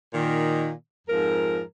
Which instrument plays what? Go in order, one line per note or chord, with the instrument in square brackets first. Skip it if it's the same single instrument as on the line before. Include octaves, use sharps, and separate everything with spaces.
[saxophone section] A#2 D#3
F2 G#2 F3 A#4